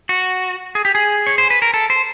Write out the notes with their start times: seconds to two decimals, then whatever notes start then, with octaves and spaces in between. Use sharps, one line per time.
0.09 F#4
0.75 G#4
0.85 G4
0.95 G#4
1.27 C#5
1.38 C5
1.50 B4
1.62 A#4
1.74 A4
1.90 C5